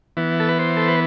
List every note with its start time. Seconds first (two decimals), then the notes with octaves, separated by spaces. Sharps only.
0.17 E3 B3
0.40 A4
0.49 B4
0.59 C5
0.77 A4
0.88 B4